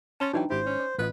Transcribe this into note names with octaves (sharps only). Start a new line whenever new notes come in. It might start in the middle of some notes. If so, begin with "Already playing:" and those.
C#4 A5 C6 A6
E3 F#3 D4 D#4 C#5 D5 G5
G#1 E4 G4 C5
C#4
D5
A1 F4 B4 D#5